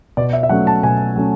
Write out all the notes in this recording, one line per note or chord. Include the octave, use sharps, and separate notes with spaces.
B2 D5
E5
E5
F#3 A3 C#4 F#5
A5
B2 G#5
F#3 A3 C#4